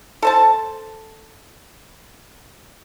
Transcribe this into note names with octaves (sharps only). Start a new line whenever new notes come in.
A4 C5 A5